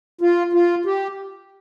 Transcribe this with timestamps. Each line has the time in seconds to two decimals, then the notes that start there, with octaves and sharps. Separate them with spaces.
0.21 F4
0.53 F4
0.85 G4